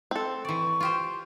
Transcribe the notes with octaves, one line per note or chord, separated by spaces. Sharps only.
C4 A4
E3 D5 C#6
F4 G4 C5